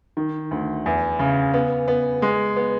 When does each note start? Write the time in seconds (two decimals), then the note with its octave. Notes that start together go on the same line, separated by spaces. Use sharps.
0.17 D#3
0.51 D2
0.86 E2
1.19 C#3
1.54 B3
1.88 B3
2.22 G#3
2.56 B3